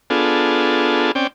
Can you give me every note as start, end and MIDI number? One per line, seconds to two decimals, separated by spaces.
0.10 1.12 59
0.10 1.12 62
0.10 1.12 65
0.10 1.12 68
0.10 1.12 69
1.15 1.27 60
1.15 1.27 61
1.15 1.27 74
1.15 1.27 79